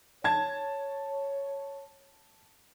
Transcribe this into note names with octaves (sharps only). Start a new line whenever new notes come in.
C#5 A5 G#6